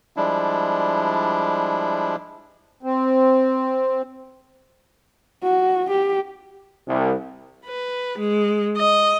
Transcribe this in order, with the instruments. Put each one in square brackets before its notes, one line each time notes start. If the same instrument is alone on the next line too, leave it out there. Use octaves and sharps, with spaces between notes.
[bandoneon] F3 G3 G#3 D4 E4
[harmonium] C4
[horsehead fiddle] F#4
G4
[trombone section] C2
[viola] B4
G#3
D#5